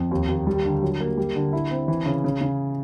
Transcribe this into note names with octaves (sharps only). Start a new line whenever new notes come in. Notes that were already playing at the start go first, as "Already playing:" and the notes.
Already playing: F2
D#2
D#2
G3
D3
F#3
A#3
G3
D3
E4
C4
E3
C#3
C#3
C#3